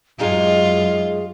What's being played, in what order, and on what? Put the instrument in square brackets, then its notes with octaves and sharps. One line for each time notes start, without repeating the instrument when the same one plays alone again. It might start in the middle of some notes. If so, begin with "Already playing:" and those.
[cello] F#2 [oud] G#3 D#4 G4 [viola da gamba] F4 [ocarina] G#4